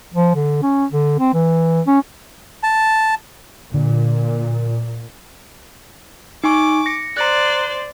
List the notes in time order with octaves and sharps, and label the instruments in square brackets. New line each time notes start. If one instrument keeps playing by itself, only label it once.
[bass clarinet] F3
D3
C#4
D3
C4
E3
C#4
[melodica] A5
[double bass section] A#2 [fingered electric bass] D3
[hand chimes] D#4 G#5 C#6 [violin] D6
[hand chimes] A#6 C#7
[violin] C5 D5 [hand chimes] A#5 F#6